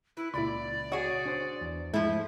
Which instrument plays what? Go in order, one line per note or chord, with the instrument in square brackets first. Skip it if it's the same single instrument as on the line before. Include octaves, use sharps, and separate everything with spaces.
[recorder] E4 [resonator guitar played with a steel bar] B4
[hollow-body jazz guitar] C#2 A#2 [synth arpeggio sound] E4 B5 [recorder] D5
[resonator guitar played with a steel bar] F#4 G#4 [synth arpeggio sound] C#5
[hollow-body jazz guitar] D4 C5
E2
[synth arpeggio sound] G#2 [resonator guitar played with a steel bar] F3 E4 [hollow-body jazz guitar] A3